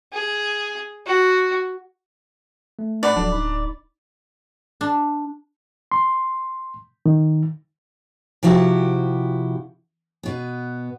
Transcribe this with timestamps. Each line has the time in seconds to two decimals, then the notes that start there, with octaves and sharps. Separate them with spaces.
0.13 G#4
1.06 F#4
2.79 A3
3.03 D4 D5 F#5 B5
3.16 D1 F3 F#3 D4 A4
3.32 D#4 B5
4.81 D4
5.92 C6
7.06 D#3
8.43 C3 F3 E4 F#4 G4
10.23 B2 B3